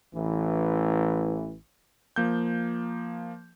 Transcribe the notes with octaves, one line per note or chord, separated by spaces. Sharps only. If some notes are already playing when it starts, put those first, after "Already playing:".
A1 E3
F3 A#3 G6